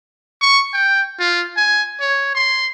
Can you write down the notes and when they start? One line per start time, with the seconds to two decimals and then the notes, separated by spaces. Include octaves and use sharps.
0.41 C#6
0.73 G5
1.20 F4
1.57 G#5
2.01 C#5
2.35 C6